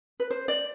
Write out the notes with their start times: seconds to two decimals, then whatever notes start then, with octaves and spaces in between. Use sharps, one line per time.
0.20 B4
0.30 C5
0.48 D5